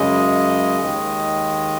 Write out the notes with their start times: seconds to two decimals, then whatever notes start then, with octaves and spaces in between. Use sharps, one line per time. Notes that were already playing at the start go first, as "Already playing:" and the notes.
Already playing: F#2 C#3 G#3 D#5
0.82 D#2 D#3 G#3